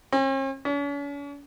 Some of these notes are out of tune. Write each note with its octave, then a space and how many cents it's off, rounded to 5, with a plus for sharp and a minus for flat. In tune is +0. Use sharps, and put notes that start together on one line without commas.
C#4 -45
C#4 +45